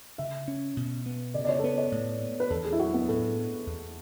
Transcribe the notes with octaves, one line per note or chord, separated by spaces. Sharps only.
C#3 E5
C#4
B2
B3
C#3 D5
D5
C#5
A4
B3 B4
C#5
A2
B3
B4
E2 A4
G#4
E4
F#3 F#4
B3
A2 A3
B3
E2